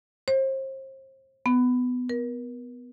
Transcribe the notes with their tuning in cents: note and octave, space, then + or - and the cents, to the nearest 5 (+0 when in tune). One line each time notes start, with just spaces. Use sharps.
C5 +35
B3 +15
A#4 +35